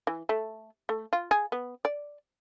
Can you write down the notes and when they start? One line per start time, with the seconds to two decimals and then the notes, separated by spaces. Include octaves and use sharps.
0.07 E3
0.29 A3
0.89 A3
1.13 F4
1.31 G#4
1.52 B3
1.85 D5